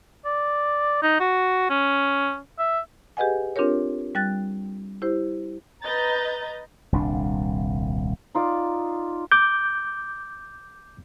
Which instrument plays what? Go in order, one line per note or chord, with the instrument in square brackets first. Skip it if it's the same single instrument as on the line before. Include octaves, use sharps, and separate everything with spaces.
[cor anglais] D5
D#4
F#4
C#4
E5
[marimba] G4 G#4 B4 D#5 F#5 G#5
C4 D4 F4 G4 A#4 C#5
G3 G5 F#6 A6
E4 G4 C5
[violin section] B4 D#5 A#5 G6 A6
[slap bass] D#1 C2 D4
[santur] D#4 F4 D5
[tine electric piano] D6 G6